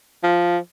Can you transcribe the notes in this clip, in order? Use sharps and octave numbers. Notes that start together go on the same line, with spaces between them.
F3